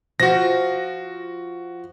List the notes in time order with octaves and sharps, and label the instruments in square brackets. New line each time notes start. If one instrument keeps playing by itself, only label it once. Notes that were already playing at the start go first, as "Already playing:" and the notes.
[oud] F3 [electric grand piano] F#4 A#6